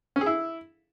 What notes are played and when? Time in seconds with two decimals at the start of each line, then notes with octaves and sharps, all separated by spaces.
0.16 C#4
0.21 G#4
0.26 E4